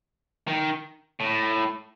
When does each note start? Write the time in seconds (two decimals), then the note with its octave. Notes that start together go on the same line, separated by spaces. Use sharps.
0.47 D#3
1.20 A2